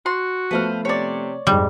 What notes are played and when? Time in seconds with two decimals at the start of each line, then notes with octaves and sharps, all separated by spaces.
0.06 F#4 C6
0.51 F3 A3 B3 B4 C5 F5
0.85 C3 C#5 D5
1.47 F2 G#2 G3